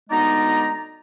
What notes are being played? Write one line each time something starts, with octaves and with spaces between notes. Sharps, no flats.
D2 G#3 B3 D#4 D5 A#5